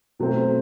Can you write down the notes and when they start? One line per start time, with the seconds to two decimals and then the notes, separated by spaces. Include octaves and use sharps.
0.19 B2 F#3 A3 C4